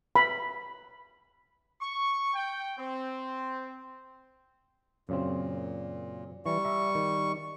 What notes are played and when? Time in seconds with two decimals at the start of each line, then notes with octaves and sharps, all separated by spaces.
0.16 B5
1.80 C#6
2.34 G5
2.79 C4
5.09 F#2 A#2 C#3 C4
6.46 E3 G3 C#6
6.65 E5 A#5
6.95 D#3